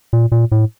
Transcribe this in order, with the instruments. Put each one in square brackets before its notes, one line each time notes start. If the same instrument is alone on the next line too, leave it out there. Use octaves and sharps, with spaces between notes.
[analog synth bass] A#2
A#2
A2